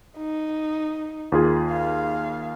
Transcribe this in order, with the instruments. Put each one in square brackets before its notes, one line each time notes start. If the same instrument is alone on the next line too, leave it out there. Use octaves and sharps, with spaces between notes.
[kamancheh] D#4
[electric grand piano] D#2 F4 G#4
[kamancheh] F5